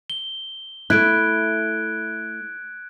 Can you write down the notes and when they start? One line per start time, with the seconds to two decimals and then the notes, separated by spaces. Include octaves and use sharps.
0.10 G7
0.90 A3 E4 F#6 G#6 D7